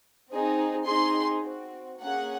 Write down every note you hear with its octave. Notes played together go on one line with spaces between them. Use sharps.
C4 D#4 G#4
C4 D#4 G#4 C6
C4 F#4
A#3 C#4 G#4 F#5